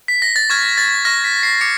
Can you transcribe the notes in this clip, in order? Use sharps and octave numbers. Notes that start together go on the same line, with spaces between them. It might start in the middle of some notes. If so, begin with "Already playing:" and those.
B6
A#6
A6
C#6 F6 G#6
A6
C#6 F6 A#6
B6
C7
D6 C#7